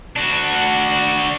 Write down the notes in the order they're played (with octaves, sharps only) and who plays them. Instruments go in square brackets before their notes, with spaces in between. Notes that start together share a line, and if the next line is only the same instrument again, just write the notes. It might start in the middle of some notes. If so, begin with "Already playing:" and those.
[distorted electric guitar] D4 F#4